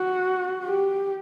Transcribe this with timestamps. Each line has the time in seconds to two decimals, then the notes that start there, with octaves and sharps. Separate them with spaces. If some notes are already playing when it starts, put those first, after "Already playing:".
Already playing: F#4
0.65 G4